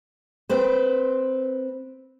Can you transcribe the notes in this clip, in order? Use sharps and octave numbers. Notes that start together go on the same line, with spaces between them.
C4 B4 C5